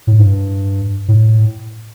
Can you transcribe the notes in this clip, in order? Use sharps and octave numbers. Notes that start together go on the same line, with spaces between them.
A2
G2
A2